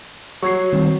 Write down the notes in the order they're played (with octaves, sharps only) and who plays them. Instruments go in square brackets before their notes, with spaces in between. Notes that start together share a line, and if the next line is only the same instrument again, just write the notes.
[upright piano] F#3 [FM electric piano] C#6 G#6 C7
[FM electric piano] D#3 G3 C4